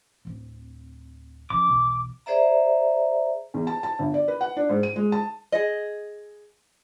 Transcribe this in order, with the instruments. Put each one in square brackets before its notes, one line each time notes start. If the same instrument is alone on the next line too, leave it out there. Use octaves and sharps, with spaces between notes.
[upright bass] D1 C4
[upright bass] C#3 F3 [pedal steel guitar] D6
[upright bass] B1 E2
[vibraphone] G#4 C5 D5 E5 A#5
[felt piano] E2
A5
A5
G1
D5
B4
F#5
D4
G#2
D#7
G#3
A5
[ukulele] G#4 D#5